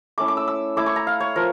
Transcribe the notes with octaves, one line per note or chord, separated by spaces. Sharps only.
A3 C#4 E4 D6
D6
E6
E6
A3 E4 D6
C#6
A#5
F5
C#5
F3 A#4